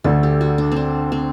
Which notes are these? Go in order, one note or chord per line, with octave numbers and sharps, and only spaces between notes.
D2 D3 A3 A4
G4
F#4
D4
C4 D4
C4